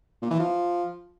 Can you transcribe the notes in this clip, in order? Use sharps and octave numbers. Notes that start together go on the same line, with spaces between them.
A#2
E3
F3